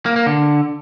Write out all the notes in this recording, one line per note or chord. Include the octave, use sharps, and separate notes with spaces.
A#3
A#3
D3